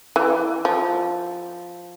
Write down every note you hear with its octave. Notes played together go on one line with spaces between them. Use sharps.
E3
F3